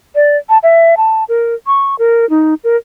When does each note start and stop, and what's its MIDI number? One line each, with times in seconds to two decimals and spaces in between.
0.15 0.37 74
0.49 0.58 81
0.63 0.95 76
0.97 1.24 81
1.29 1.55 70
1.67 1.95 85
1.99 2.28 70
2.30 2.54 63
2.64 2.77 70